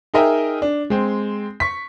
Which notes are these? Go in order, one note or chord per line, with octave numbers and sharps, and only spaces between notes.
D#4 G#4 A#4 D#5 E5 G5
D4
G#3 C4
C#6 B6